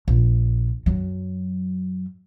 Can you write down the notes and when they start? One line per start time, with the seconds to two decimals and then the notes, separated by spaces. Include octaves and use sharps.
0.08 A#1
0.86 F#2 F#3